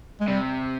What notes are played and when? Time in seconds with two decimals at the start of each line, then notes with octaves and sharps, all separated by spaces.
0.21 G#3
0.27 C3 G3